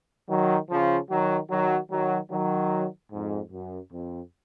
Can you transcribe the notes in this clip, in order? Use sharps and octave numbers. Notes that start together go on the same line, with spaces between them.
D#3 F#3
C#3 F3
D#3 F#3
D#3 F#3
D#3 F#3
D#3 F#3
F2 G#2
F#2
F2